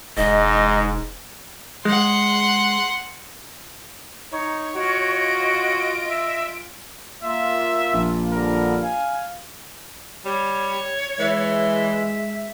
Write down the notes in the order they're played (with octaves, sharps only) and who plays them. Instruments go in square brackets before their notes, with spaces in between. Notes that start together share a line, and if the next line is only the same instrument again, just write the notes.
[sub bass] E1 [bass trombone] G#2 [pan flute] D#5
[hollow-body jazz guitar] G#3 [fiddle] F#5 C6
[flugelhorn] D#4 [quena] C#5
[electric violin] F4 D7 [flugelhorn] F#4 [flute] D#5
[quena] E5
[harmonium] A#3 F4 [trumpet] E5
[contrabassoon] A#1
[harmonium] D3 F3 G3 [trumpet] A#4
[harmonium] F5 [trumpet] G#5
[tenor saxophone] G3 [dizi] C#5
[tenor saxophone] E3 [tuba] G#3 [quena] E5